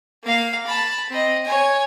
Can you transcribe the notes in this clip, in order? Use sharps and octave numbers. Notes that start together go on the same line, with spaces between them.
A#3 F5
A5 B5
C4 D#5
C#5 G#5